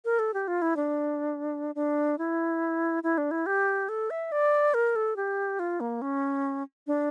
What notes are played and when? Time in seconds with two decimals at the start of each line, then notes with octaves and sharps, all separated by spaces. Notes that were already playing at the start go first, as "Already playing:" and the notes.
0.05 A#4
0.19 A4
0.34 G4
0.48 F4
0.62 E4
0.76 D4
1.75 D4
2.18 E4
3.03 E4
3.18 D4
3.31 E4
3.46 G4
3.89 A4
4.10 E5
4.32 D5
4.74 A#4
4.96 A4
5.16 G4
5.59 F4
5.80 A#3
6.02 C#4
6.87 D4